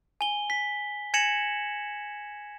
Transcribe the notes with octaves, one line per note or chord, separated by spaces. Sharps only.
G#5 G7
B6
G#5 G#6 A#6 C#7 E7 F#7